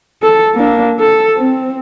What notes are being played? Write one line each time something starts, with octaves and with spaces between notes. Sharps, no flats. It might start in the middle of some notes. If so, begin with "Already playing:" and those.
A4
A#3 D4
A4
C4